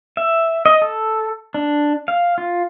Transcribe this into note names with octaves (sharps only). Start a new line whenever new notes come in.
E5
D#5
A4
D4
F5
F4